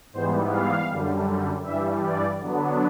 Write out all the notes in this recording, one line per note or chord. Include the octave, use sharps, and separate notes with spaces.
G#2 E3 G3 B3 C5
F5
F#2 D3 G3
G2 E3 G3 E5
D5
D3 F#3 B3 D4